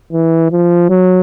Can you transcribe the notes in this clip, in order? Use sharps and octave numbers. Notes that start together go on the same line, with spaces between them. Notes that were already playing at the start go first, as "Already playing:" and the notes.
E3
F3
F#3